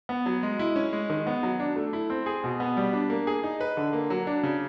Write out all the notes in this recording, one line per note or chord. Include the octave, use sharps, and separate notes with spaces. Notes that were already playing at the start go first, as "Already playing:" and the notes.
B3
F#3
G#3
E4
C#4
G#3
D#3
B3
F#3
D4
A3
E4
C4
G#4
B2
B3
G3
D4
A#3
G#4
D#4
B4
D3
A#3
F#3
D4
C#3